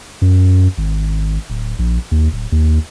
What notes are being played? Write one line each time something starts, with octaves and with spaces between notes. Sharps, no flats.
F#2
G#1
D1
A#1
D#2
D1
D#2